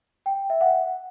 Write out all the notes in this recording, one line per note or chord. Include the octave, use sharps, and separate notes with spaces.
G5
E5
F#5